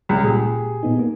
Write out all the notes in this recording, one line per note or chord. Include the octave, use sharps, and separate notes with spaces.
C#2 G3
A#2 G4 G#4
A#2 B3 D#4
A#3